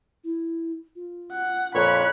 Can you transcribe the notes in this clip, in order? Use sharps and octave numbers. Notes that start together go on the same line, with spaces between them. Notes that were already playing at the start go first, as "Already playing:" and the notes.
E4
F4
F#5
F2 A#2 C#5 B5 F#6